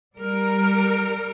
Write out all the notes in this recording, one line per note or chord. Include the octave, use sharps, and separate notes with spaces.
G3 A#4